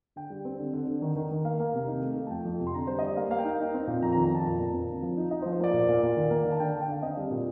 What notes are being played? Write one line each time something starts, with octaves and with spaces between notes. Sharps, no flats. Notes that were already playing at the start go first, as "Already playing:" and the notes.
D3 G5
G3
C4
D3
D3
D3
D#3
D#3
D#3
A#3 F5
A#3
C3
D#4
A3
A3
A5
F2 G5
F2
C3
C6
D3 A#5
G3 C5
D#5
G3 D5
A#3 F5
A#3 F5
G5
D#4
D#4
C4
A#2
F2 A#5
A#5
D#3
A#5
F2 A5
A#2
A#2
C4
D3
F3
D#4
D#4 D#5
C5
F3
C5
A#3 D5
A#2
A#2
A#2
D#3
A#3
D#3
A5
D3 G5
D3 A5
G5
D3 F5
C4 D#5
G3
A#2